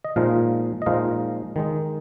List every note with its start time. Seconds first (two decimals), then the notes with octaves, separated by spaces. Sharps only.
0.05 D#5
0.16 A#2 F3 G#3 D#4 F5
0.82 D#5
0.86 A#2 F3 G#3 D#4 F5
1.56 D#3 G#3 D#4